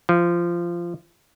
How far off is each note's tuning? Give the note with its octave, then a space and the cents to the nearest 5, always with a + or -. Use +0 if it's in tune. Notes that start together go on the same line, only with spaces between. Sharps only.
F3 -15